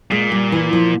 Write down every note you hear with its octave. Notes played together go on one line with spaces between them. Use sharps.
A#2 G#3
G3
E3
F3